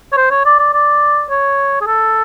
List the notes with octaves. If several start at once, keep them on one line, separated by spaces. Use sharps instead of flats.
C#5
C5
C#5
D5
D5
D5
C#5
G#4
A4